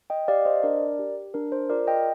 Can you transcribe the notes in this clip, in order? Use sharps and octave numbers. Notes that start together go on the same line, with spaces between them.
D#5 G5
G4 D5 F5
C5 D#5
D4 A#4 D5
G4
D4 A#4
C5
F4 G#4 A#4 D5
D#5 G5